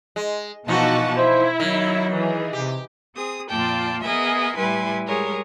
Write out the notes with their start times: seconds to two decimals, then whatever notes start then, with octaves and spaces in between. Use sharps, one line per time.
0.16 G#3
0.68 B2 E3 F3 D#4 F#4 A5
1.17 E4 C5
1.60 D#3 F#3
2.12 E3 G#4
2.53 C3 G4
3.14 C4 G#4 D#6
3.49 F2 A#2 F4 D5 G5 A5
4.02 B3 G#4 A#4 D#5 E5 G#5
4.57 A2 G3 E4 B4 G#5 C6
5.06 G3 G#3 G#4 A#4 C#5